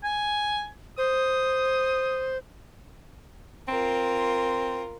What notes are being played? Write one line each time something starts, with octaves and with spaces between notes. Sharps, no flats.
G#5
C5 D#6
C4 F4 A#4